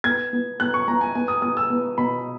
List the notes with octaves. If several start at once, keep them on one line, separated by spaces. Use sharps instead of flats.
B3 G#6
B3
B3 F#6
C#6
B3 A#5
G#5
B3 G#5
D#6
B3 D#6
E6
B3
B2 B5